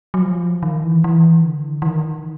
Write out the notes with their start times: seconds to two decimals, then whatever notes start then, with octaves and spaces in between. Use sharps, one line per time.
0.14 F#3
0.22 F3
0.63 D#3
0.84 E3
1.04 E3
1.42 D#3
1.45 D3
1.82 E3
1.86 D#3